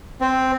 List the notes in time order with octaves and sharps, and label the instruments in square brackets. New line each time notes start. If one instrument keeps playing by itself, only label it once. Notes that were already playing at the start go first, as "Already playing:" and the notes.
[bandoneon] C4